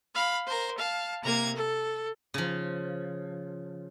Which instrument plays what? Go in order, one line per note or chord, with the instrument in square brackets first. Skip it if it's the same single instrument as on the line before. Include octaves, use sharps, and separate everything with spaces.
[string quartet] F5 B5
A#4 C5
F5 A5
C3 A#3 A#5 G#6
A4
[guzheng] C#3 F3